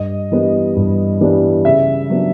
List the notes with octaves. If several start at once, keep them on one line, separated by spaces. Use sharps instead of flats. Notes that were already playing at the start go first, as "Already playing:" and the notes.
Already playing: G2 D#5
E3 G3 B3 D4
G2
E3 G3 B3 D4
C#3 E5
F#3 B3 D4